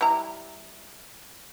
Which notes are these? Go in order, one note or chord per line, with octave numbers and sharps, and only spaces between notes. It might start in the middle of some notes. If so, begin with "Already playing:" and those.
G3 E4 A#5